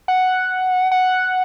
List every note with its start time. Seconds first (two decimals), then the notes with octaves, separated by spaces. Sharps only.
0.08 F#5
0.92 F#5